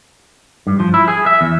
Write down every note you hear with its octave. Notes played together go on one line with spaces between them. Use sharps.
G2
F3
E4
G#4
E5
E2